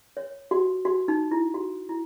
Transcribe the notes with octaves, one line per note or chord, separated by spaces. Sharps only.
C#5
F#4
F#4
D#4
E4
F#4
E4